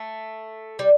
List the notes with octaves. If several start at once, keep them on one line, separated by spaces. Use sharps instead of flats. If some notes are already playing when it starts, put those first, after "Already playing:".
Already playing: A3
G3